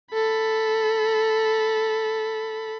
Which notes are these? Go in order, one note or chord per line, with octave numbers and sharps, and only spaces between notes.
A4 B5